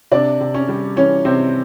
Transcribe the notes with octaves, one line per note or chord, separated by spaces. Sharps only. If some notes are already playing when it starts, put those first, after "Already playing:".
C3 D4 D5
C3
C#4 C#5
G3
E3 C#4 C#5
C3 C4 C5